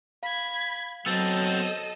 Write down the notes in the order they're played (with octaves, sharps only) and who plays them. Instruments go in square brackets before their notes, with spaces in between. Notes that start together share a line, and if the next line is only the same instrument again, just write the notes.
[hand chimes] F5 [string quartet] B5 G#6
[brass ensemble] F#3 [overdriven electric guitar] B3 C4 [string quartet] A4 D#5 [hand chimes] E6 A6